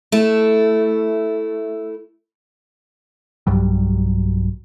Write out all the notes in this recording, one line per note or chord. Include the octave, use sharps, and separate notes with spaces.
A3 E4
B1 G2 F#3 G3